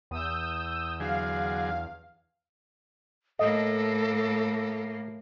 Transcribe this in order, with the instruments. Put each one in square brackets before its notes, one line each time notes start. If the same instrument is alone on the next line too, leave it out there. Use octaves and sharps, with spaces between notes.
[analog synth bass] E2 [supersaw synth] D#6 E6 G6
[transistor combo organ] D3 F#3 G#4 [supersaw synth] F5
[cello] A2 A#3 [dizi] A4 [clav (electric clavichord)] D#5